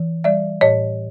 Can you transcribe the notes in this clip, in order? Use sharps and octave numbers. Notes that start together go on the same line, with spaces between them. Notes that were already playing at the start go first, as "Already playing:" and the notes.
Already playing: E3
G3 D5 E5
A2 C#5 D#5